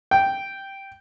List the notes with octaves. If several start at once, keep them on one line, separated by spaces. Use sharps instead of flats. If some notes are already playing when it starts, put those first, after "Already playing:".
G5